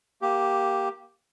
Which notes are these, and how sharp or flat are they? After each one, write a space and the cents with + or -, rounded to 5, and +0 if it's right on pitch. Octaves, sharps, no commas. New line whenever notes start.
A#3 +0 G4 +0